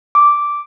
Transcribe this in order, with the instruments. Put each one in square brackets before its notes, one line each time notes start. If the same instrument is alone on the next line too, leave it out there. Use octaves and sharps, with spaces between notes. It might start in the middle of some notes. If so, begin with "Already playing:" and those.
[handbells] D6